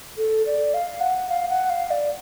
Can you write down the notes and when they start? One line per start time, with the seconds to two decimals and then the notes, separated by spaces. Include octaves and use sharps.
0.17 A4
0.46 D5
0.74 F5
1.00 F#5
1.29 F5
1.50 F#5
1.70 F5
1.91 D5